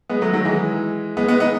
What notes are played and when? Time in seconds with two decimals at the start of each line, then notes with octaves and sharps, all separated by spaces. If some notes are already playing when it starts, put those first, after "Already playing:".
0.10 G#3 B3
0.21 F#3 A3
0.34 D#3 F#3
0.45 E3 G#3
1.17 G#3 B3
1.28 G#3 B3
1.40 B3 D#4